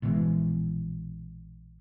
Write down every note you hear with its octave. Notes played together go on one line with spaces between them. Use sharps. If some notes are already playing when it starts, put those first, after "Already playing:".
A#1 B2 E3 G#3